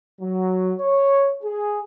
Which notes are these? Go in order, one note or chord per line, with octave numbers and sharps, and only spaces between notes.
F#3
C#5
G#4